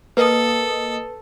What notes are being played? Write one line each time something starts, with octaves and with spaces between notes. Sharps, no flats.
A#3 A4 B4 D#5 D#6